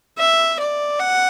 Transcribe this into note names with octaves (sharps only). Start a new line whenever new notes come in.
E5
D5
F#5